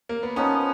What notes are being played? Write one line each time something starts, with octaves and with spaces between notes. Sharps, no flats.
A#3
B3
F3 B3 C#4 D#4